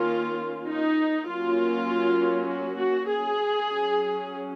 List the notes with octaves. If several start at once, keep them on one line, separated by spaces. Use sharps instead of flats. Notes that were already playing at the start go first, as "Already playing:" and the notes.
Already playing: D#3 A#3 C#4 F4
D#4
F#3 A#3 C#4 F4
F#4
F#4
G#4
F#3 C#4